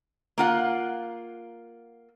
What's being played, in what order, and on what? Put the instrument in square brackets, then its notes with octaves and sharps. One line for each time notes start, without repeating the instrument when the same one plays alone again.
[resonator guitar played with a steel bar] A#3 F4 F#5